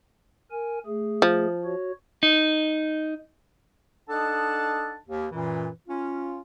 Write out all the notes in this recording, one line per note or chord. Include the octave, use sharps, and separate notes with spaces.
A#4 G#5
A3 G#4
F3
F#4 C#5
D#4
D4 D#4 A4 D#5 F#5 A5
D#2
F#2 A#2 E3
C#4 F4